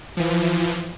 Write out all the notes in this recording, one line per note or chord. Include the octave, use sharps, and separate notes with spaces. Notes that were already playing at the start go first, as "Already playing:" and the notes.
E3 F3